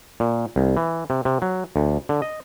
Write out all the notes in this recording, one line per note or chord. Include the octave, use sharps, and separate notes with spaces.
A#2
C2
E3
C3
C3
F#3
D2
D3
D#5